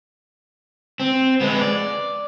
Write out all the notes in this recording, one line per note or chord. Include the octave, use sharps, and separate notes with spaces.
C4
G#3 B3
D5